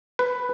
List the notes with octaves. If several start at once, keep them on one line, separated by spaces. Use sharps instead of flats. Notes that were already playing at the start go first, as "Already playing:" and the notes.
B4